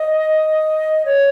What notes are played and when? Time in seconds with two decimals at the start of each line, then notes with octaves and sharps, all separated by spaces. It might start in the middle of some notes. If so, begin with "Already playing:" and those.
Already playing: D#5
1.05 C#5